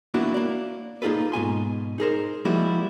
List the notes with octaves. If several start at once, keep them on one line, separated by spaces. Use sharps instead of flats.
A#3 B3 D4 E4 F#4
A#3 D5
A#3 D#4 F4 G#4 A4 B4
G#2 B2 G#5 C6
D#4 G#4 A#4 C5
F3 G3 G#3 A#3 E4 F#4